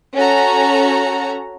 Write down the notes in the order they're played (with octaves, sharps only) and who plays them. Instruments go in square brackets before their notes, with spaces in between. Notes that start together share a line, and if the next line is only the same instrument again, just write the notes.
[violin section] C#4 F#4 A4 A#5